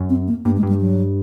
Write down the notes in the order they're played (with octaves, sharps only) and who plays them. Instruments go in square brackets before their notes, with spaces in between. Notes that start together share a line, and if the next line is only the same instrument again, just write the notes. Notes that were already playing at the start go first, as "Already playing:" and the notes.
Already playing: [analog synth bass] F#2
[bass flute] C4
A#3
[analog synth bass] G2 [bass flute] A#3
[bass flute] G#3
[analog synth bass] G2
[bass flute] G3
F#3